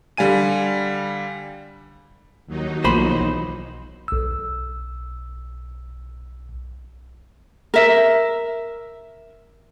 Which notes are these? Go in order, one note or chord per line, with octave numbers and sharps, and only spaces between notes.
D3 G3 F5 G#5 D#7
D#2 F#3 D#4
B1 E3 F3 A#3 C5 B5 C6
B1 E6
A#4 E5